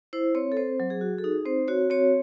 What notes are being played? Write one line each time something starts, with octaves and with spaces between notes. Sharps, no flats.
E4 C5
C4 C#5
A4
C4 C5
F#3
G#4
F#4
A4
D#4 G#4
C4 C5
F#4 C#5
C4 C#5